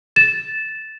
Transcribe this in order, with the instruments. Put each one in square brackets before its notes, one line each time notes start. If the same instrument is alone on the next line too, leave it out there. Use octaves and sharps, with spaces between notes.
[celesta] A6 E7